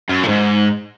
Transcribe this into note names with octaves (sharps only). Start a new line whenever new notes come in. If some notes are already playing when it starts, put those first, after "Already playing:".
F#2
A#2
G#2